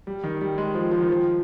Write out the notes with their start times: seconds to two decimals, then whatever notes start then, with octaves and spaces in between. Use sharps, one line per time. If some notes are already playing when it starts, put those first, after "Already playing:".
0.07 G3
0.24 D#3
0.41 G3
0.58 G#3
0.74 F3
0.91 F3
1.01 D#3
1.09 F3